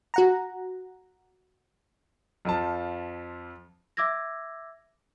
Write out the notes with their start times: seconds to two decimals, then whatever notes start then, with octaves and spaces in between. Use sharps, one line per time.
0.14 F#4 F#5 A#5
2.45 F2 F3 A5
3.97 E5 D6 E6 G#6 A#6